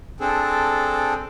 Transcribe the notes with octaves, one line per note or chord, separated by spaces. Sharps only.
C4 D4 G#4 A4